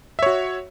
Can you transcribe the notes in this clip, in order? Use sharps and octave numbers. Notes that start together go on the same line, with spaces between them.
F#4 C#5 E5